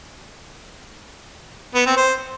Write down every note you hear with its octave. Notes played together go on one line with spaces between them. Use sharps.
B3
C4
C5